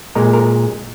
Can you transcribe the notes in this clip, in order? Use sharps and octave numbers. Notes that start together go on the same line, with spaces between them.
A#2 G#3 A#4
A#4